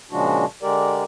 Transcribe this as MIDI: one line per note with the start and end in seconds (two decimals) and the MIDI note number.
0.11 0.45 46
0.11 0.45 49
0.11 0.45 53
0.11 0.45 56
0.11 0.45 62
0.11 0.45 66
0.62 1.04 50
0.62 1.04 56
0.62 1.04 67
0.62 1.04 70
0.62 1.04 74